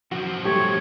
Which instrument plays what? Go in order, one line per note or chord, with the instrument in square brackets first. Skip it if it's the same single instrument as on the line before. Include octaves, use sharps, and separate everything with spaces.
[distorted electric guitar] F#2 F3 [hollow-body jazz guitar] F#4
[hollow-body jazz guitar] G2 F#3 A3 [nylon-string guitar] G4 [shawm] C#5